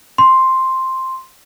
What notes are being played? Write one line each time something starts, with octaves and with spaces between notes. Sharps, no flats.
C6